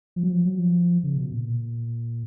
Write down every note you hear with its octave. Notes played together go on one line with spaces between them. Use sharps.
F3
F#3
F3
F#3
F3
C#3
B2
A#2